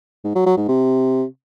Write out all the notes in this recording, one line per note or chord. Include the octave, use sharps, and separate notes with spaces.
G#2
F#3
F#3
G#2
C3